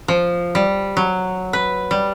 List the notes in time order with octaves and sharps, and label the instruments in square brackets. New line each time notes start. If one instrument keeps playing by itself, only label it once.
[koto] F3
G3
F#3
B4
G3